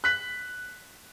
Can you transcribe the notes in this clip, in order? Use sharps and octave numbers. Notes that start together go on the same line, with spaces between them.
F#6 B6 F#7